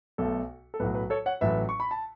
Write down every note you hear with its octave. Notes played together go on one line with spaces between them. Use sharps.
B1 B2 A3 A4
A4
B1 A2 F#3 B4
B4
A4 C#5
C#5 F#5
A1 A2 F#3 B4 E5
C#6
B5
A5